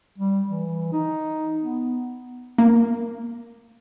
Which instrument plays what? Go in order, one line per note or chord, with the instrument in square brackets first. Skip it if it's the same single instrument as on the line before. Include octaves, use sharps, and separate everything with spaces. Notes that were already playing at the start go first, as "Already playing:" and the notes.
[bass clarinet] G3
E3
D#4
B3
[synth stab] A#3